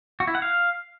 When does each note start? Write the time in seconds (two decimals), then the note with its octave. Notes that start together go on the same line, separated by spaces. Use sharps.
0.20 F#4
0.27 E4
0.35 F#5
0.42 F5